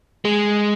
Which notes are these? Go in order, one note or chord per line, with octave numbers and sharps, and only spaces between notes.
G#3